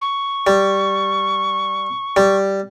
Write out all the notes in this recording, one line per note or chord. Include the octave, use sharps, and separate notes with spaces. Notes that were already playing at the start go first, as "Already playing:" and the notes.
C#6
G3
G3